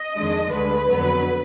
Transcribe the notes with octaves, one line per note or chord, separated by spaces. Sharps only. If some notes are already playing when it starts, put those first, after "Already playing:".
Already playing: D#5
F2 D#3 G#3 D4
D2 D3 G#3 B4
F2 D3 F#3 B3